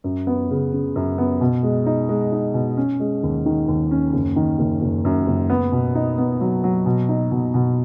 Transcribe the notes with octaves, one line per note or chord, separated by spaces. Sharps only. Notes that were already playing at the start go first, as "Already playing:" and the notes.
F#2
B3
C#3
C#3
F#2
B3
B2
G#3
D#4
G#3
D#4
B2
C#4
G#3
D#2
D#3
D#2
C#4
F#1
D#3
F#1
F#1
F#2
F#1
B3
B2
D#4
B3
F#3
F#3
B2
D#4
B2
B2